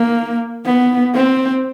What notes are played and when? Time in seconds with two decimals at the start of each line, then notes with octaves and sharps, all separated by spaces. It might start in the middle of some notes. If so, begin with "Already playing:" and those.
Already playing: A#3
0.66 B3
1.14 C4